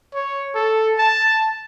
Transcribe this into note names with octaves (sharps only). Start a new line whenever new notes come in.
C#5
A4
A5